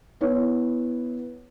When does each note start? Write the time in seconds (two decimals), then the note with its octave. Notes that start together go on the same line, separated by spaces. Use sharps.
0.21 B3 E4 C#5